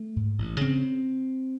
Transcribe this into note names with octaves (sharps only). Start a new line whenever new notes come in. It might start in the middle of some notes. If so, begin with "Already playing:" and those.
Already playing: A3
G#2
A1
C#3 C4